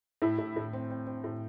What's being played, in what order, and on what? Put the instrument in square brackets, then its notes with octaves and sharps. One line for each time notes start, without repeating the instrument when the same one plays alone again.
[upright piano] A2 [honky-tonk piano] E4
[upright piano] A2
A2
C4
C4
C4
A2